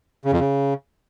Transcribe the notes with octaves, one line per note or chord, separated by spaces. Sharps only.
C#3
F2
C#3